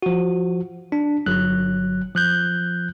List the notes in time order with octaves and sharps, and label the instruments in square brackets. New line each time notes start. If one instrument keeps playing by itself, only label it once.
[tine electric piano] F3 F#4
D4
G1 F#3 F#6
F3 F#6 G6